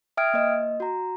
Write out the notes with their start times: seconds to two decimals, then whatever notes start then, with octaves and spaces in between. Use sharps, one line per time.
0.17 E5 G5 D#6 F6 G#6 D7
0.34 A#3 D#5
0.80 F#4 A#5